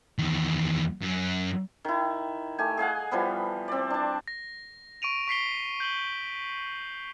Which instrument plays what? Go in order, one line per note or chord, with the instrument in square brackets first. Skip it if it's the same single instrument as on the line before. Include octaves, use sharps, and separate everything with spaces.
[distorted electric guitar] E2 D#3
F#2
[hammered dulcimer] D#3 E4
A3 G4 G#5
G#4 D#5 F5 F#5
E3 F3 G3 B3
C4 D5
D4 A5
[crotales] A#6
C#6 D7 D#7 F7
C#6 B6 C7 G7
G6 F#7 G7